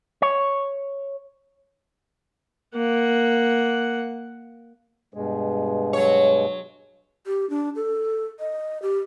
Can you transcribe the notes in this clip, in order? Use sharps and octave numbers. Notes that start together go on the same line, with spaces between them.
C#5
A#3 F#5
G2 B2 G#3
F#3 C#5
G4
D4
A4
D#5
G4